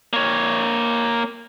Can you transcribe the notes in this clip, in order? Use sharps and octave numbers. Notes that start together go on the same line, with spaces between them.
A#3 C#5